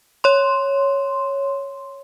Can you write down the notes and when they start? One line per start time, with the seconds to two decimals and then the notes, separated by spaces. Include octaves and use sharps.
0.24 C#5 C6